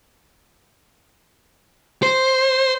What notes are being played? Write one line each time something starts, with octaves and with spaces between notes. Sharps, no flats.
C5